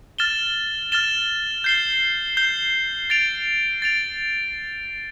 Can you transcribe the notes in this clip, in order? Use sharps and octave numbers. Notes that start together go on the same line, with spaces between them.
F6 A6 E7 G7
F6 A6 E7 G7
G6 C7 G7
G6 C7 G7
A6 D7 F7
A6 D7 F7